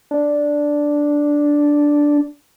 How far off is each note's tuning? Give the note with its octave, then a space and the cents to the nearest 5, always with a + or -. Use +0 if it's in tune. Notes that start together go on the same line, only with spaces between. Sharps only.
D4 -5